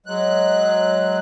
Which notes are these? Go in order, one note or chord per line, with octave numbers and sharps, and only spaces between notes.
F#3 G#3 F#6